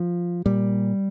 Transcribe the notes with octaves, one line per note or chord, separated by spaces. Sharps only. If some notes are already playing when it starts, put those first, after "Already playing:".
Already playing: F3
A#2 G3